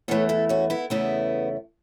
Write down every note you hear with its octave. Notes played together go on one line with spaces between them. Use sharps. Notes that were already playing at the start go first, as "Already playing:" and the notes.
E2 E3 A3 A4 C#5
E4 A4
C#4 F#4
B3 E4
E2 C#3 A3 B3 E4